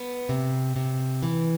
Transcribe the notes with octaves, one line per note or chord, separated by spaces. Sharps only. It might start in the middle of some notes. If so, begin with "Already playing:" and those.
Already playing: B3
C3
C3
E3